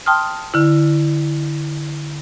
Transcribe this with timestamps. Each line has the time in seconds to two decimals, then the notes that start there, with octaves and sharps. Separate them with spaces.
0.06 G5 A5 C6 D#6 F6
0.54 D3 E4